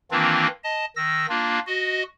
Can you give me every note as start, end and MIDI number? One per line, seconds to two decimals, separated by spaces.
0.11 0.47 51
0.11 0.47 52
0.11 0.47 58
0.11 0.47 60
0.11 0.47 62
0.11 0.47 65
0.64 0.85 75
0.64 0.85 81
0.96 1.26 51
0.96 1.26 88
0.96 1.26 94
1.29 1.59 58
1.29 1.59 62
1.29 1.59 65
1.67 2.03 66
1.67 2.03 75